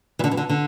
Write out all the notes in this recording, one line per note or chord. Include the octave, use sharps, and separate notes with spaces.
E3
D3
E3
D3
D3